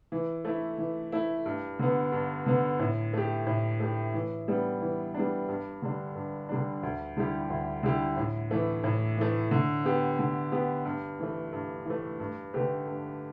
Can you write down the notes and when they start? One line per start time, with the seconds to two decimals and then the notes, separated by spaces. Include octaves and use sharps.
0.12 E3
0.45 A3 E4
0.78 E3
1.12 A3 E4
1.46 G2
1.79 D3 B3
2.12 G2
2.46 D3 B3
2.79 A2
3.13 A3 G4
3.47 A2
3.80 A3 G4
4.14 E3
4.48 G3 B3 D4
4.81 E3
5.14 G3 B3 D4
5.48 G2
5.82 D3 G3 D4
6.15 G2
6.49 D3 G3 D4
6.83 D2
7.17 D3 G3 E4 G4
7.50 D2
7.83 D3 G3 E4 G4
8.17 A2
8.51 E3 A3
8.84 A2
9.17 E3 A3
9.51 D3
9.85 B3 G4
10.19 D3
10.52 B3 G4
10.85 G2
11.20 E3 A3
11.53 G2
11.86 E3 A3
12.20 G2
12.53 D3 A3 G4 B4
12.87 G2